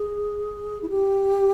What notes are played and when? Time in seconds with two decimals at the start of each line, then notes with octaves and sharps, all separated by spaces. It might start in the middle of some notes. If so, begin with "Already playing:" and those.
Already playing: G#4
0.82 E4
0.90 G4